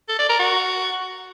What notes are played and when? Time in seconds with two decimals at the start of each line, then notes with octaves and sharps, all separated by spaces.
0.09 A4
0.19 D5
0.29 A#4
0.39 F#4